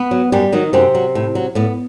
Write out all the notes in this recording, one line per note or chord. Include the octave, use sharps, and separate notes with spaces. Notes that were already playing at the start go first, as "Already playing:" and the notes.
Already playing: B3 B4
F#3
F#2 G3 G4
D#3 F#3 D#4
F#2 C3 C4
F#3
A2
F#3
A2 B3